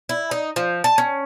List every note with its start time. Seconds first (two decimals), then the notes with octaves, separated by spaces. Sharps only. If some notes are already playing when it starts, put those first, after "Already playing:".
0.09 E4
0.31 D#4
0.56 F3
0.84 A5
0.98 C#4